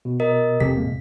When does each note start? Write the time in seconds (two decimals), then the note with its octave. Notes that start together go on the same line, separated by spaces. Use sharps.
0.05 B2
0.20 A#4 D#5
0.60 E1 C3 C4 G4 A4 B6
0.77 A2 G#3 A#3